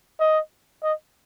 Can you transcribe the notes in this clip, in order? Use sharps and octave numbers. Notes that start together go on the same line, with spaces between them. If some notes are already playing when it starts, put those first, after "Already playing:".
D#5
D#5